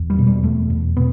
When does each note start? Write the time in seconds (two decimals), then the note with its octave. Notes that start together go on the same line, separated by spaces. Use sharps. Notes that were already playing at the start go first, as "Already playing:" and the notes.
Already playing: E2
0.10 G3
0.19 B2
0.27 G3
0.43 E2 A3
0.70 E2
0.96 B2 B3